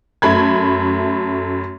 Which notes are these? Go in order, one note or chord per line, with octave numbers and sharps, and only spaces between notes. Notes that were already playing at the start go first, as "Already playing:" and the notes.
F#2 A3 B5 G#6